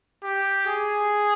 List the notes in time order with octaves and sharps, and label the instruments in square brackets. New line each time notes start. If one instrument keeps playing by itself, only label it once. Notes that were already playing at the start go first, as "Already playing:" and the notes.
[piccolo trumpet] G4
G#4